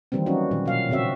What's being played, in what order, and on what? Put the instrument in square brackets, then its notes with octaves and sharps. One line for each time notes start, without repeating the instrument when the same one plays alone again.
[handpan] D#3 E3 G3 A#3 C4
F#3 C#4 D#4 F#4
A#2 D#3 F#3
B2 F#3 F5
A#2 C#3 C4 F#4 E5